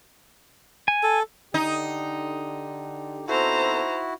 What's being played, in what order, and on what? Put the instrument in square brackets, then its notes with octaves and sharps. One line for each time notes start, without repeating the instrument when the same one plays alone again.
[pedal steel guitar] G#5
[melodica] A4
[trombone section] D3 G4 [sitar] D#4
[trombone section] B2 C4 A4 [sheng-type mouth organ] E4 F#4 [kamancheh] C5 A#5